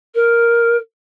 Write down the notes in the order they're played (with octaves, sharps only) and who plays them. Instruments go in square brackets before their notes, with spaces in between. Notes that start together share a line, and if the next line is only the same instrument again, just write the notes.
[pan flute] A#4